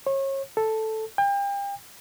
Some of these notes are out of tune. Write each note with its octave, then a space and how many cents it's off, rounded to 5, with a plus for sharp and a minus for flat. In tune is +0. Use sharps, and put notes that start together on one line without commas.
C#5 -30
A4 +0
G5 +35